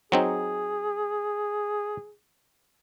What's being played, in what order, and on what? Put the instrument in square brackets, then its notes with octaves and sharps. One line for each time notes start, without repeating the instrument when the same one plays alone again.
[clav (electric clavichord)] F#3 C4 D#4 [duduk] G#4